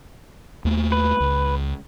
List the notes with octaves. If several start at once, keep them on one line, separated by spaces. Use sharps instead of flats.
D#2 A3
B4
C#2